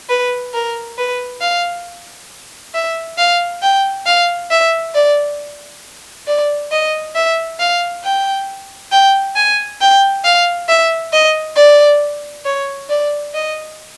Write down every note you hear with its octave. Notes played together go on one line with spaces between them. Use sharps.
B4
A#4
B4
F5
E5
F5
G5
F5
E5
D5
D5
D#5
E5
F5
G5
G5
G#5
G5
F5
E5
D#5
D5
C#5
D5
D#5